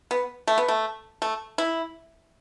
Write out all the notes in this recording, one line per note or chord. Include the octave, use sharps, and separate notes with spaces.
B3
A3
B3
A3
A3
E4